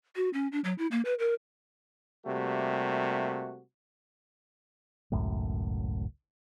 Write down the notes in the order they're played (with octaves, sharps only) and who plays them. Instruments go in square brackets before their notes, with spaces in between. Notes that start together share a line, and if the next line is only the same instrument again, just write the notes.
[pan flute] F#4
C#4
D4
F#3
E4
A#3
B4
A#4
[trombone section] C3 G3 A3 A#3 F#4
[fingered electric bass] G#1 C#2 F#2 A2